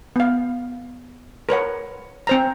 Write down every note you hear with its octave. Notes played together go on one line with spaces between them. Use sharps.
B3 F5
A#4 B4 C#5 F#5
C4 C5 A#5